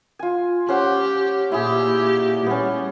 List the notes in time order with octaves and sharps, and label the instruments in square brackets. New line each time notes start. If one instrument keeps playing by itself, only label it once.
[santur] F4 G#5
[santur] C#4 C5 F#5 [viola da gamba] G4
[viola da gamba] A#2 G4 [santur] E4 G#4
[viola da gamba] G3 [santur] B3 C#4